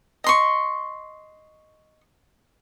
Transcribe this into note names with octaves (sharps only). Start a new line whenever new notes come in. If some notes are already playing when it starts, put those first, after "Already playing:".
D#5 C6 C#6